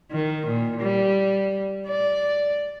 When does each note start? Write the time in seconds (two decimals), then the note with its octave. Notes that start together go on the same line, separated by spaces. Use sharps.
0.11 D#3
0.47 A#2
0.81 G3
1.88 D5